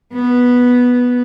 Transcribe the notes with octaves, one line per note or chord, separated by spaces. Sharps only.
B3